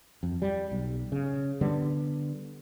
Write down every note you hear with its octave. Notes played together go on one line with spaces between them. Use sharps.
F2
G3
B1
C#3
D3 G3 B3